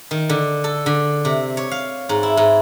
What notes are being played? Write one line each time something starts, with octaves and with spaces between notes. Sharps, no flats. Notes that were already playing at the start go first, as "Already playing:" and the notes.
D#3
D3
A4
D3
C3
C#5
F5
G#2
E4
G#2